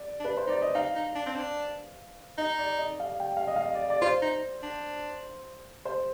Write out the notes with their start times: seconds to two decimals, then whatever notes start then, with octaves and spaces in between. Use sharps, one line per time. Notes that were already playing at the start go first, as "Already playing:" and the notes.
Already playing: D5
0.20 D4
0.25 B4
0.37 C5
0.47 D#4 D5
0.62 D#5
0.74 D#4 F5
0.95 D#4
1.16 D4
1.26 C4
1.36 D4
2.38 D#4 D#5
2.58 D5
2.79 D#5
3.00 F5
3.20 G5
3.37 F5
3.47 D#5
3.56 F5
3.65 D#5
3.75 D5
3.90 D5
4.02 F4 C5
4.22 D#4
4.63 D4
5.85 C5